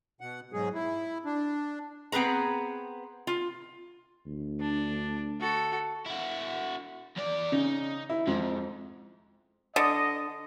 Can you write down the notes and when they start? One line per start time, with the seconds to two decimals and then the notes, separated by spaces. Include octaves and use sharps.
0.20 B2 F#5
0.53 G#2 B2 F#3 G#3 G#4
0.74 E4
1.25 D4
2.12 B3 C4 G#4 B4 A#5
3.27 F4
4.26 D2
4.60 D4
5.40 F#4 A4
6.06 E4 F#4
7.16 E2 D5
7.52 C#3 D#4
8.09 E4
8.27 F2 G#2
9.76 D3 D#5